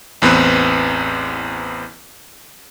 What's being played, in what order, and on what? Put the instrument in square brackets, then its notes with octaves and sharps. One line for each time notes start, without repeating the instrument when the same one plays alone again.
[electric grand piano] A1 E2 B3 C4 B4